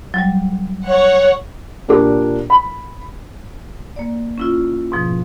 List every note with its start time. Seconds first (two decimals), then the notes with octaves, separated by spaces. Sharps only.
0.14 F#3 G3
0.86 C#5 F#5
1.88 A#2 D4 G4 A#4 D6
2.50 B5
3.96 A#3 D5
4.38 C#4 E4 F4
4.92 G#2 B2 F3